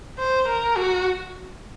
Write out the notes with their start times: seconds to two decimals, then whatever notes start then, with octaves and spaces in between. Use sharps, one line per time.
0.19 C5
0.48 A#4
0.76 F#4